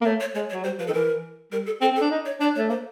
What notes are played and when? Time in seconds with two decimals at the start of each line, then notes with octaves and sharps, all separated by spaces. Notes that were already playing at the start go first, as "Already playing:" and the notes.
0.01 A#3
0.05 A3 C#5
0.20 C#5
0.35 G#3 C#5
0.49 C#5
0.54 F#3
0.64 G3 C5
0.79 F3 B4
0.87 D#3 A4
0.93 E3 A#4
1.52 G3 A#4
1.66 A4
1.81 C4 A4
1.91 C4
1.96 A4
2.01 D4
2.11 D#4
2.25 C#5
2.40 D4 D5
2.55 C#5
2.58 A3
2.69 A#3 C5